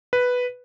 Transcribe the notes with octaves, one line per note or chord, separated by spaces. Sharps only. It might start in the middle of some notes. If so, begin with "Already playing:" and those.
B4